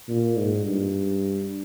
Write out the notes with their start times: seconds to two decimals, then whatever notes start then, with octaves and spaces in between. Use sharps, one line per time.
0.09 A#2
0.37 G#2
0.65 G2